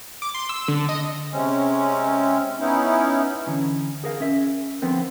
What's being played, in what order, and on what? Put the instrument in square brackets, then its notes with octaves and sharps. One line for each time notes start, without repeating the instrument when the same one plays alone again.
[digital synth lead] D6
C6
E6
D3
D#5
[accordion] C3 G#3 C4 C#4
B3 C#4 D#4 E4
[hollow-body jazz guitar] D3 E3 C#4
G#4 A#4 F5
C#4 E5
D3 F3 B3 C4 A#4